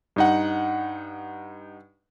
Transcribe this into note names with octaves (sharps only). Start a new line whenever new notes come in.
G2 D#4 F#5